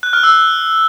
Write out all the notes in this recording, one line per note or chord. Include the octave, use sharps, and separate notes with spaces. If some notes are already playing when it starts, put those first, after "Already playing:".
F#6
F6
E6